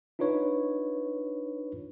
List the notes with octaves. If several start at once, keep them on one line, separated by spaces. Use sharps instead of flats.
D4 D#4 F4 B4 C#5